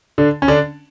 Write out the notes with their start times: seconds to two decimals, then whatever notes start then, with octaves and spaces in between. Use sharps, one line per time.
0.18 D3 D4
0.42 C#4
0.48 D3 D4